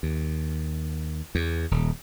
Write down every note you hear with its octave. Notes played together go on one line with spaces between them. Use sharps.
D#2
E2
D#1